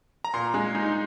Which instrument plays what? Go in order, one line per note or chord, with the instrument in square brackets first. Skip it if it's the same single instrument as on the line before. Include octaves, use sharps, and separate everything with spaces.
[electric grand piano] A#5
[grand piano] A#2 [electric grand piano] C6
[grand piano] G#3
D#4